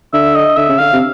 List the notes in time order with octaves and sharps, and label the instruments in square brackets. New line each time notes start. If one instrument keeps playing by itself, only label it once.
[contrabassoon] D3 [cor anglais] E5
[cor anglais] D#5
[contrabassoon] D3 [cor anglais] E5
[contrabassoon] C#3
[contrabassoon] D3 [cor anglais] F5
[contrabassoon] C3